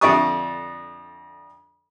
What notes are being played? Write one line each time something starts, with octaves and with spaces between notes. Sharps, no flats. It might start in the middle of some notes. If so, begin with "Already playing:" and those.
F2 D3 D5 E5 C#6 D#6